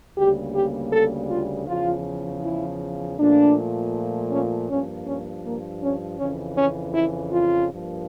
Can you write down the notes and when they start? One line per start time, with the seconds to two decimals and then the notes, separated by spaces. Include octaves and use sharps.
0.18 D2 C#3 G3 A#3 G4
0.55 G4
0.93 A4
1.31 F4
1.68 E2 C#3 F3 F4
2.43 E4
3.18 A#2 F3 A3 D4
4.32 C#4
4.69 G2 F3 A#3 C#4
5.08 C#4
5.45 A#3
5.82 C#4
6.19 F2 C#3 E3 C#4
6.58 C#4
6.95 E4
7.33 F4
7.71 G2 F3 A#3